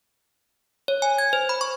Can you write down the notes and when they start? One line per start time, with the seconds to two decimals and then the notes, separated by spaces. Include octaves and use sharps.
0.88 C#5
1.02 G#5
1.18 G#6
1.33 C5
1.49 B5
1.61 C#6